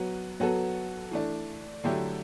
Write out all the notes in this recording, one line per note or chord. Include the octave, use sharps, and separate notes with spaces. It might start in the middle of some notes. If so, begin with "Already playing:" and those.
Already playing: F#3 B3 F#4
F#3 B3 F#4 A4
E3 A3 D4
D3 F#3 A3 E4 G4